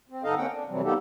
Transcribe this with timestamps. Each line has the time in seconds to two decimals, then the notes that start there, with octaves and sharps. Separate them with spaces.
0.09 C4
0.24 G2 D3 D#4 A4 D#5 F5
0.37 A#3 C4 C#4 F#5 G5
0.51 D4
0.69 F2 C3 E3 F#3 G3 C4
0.83 G3 A#3 B3 D#4 G4 A4